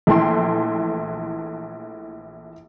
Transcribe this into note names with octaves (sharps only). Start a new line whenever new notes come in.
A#1 E3 A3 A4 G5 C6